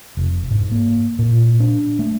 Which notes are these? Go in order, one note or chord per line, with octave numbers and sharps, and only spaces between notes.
F1
G#2
A#3
A#2
D4
A3